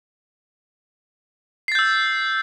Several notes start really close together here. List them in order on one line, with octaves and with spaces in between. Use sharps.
C7 A6 G6 E6